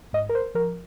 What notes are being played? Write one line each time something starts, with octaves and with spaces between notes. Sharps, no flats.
G#2 D#5
A#4
C5
F3 A#4